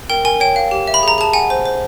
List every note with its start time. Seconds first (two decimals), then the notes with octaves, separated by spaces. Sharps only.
0.10 A#4 G5
0.25 A#4 G#5
0.40 C#5 G5
0.56 F5
0.71 G4
0.87 E5
0.94 B5
1.03 G#4 A#5
1.18 G#4 A5
1.33 F#5 G#5
1.50 C5
1.66 C5